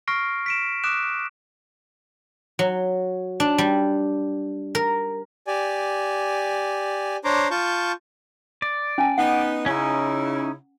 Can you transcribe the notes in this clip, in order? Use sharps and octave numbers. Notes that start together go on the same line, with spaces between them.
C#6 F6 A#6 C7 D7
B6 D7 E7
D6 D#6 F#6 D7 E7
F#3
D4
G3
A#4
G4 D5 G#5
D4 C5 C#5 A#5 C6 D6
F4 A5 C#6 G6
D5
C#4 G#5 A5
B3 D#4 F#5
C#3 C#4 D#4 E4